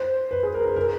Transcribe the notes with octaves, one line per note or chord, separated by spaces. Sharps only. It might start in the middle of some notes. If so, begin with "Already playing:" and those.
Already playing: C5
B4
G#4
A#4
A#4
A#4